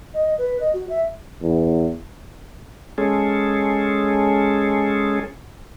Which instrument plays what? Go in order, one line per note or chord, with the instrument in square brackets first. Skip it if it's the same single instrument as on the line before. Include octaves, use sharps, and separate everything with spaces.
[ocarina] D#5
B4
D#5
F#4
E5
[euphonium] E2
[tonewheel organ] G#3 C#4 G#4 A4